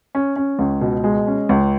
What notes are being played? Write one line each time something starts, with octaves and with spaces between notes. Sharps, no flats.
C#4
C#4
C#2
B2
G#3
C#4
C#2